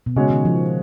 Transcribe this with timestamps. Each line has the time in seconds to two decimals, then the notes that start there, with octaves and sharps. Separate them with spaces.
0.06 B2
0.16 C#3 G#3 C#4 F#4 C#5
0.30 D#3
0.45 F3